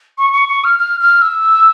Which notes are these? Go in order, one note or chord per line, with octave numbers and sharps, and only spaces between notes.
C#6
C#6
C#6
F6
F6
F6
E6